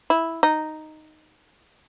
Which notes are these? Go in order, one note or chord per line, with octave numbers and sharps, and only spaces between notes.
E4
D#4